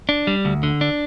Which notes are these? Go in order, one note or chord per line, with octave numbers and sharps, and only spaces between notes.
D4
G3
D2
D3
D4